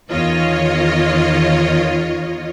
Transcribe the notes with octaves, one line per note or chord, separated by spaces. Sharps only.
E2 D#3 E3 F4 C#5 D#5